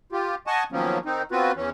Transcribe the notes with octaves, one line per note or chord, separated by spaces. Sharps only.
F4 G4
D#5 F#5 G#5 A5 C#6
D#3 F3 F#3 A#3 B3 C#4
D#3 C4 D#4
B3 C4 F4 F#4 B4
E2 E3 C#4